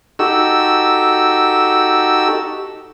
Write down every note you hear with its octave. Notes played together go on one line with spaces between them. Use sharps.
D#4 F#4 G4 A4 E6